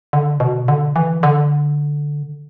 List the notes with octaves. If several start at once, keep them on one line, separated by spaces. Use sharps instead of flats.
D3
B2
D3
E3
D3